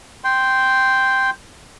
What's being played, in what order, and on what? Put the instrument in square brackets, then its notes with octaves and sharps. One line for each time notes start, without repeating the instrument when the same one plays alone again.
[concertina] G5 C6